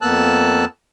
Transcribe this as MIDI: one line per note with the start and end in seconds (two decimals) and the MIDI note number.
0.02 0.65 41
0.02 0.65 58
0.02 0.65 59
0.02 0.65 81
0.02 0.65 88
0.02 0.65 90